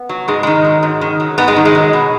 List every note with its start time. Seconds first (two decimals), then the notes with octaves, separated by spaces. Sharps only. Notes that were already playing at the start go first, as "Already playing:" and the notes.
Already playing: B3
0.09 F#3
0.28 G#2 G#3
0.43 D#3 G#3
0.64 F#3
0.83 G#2
1.01 D#3
1.20 F#3
1.38 G#2 B3
1.48 G#3
1.56 D#3
1.65 G#3
1.75 F#3
1.93 B2